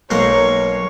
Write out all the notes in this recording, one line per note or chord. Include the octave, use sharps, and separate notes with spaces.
B1 A#3 C5 C#5